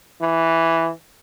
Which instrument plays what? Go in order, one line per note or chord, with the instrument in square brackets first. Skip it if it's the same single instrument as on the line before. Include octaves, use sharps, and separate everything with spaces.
[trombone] E3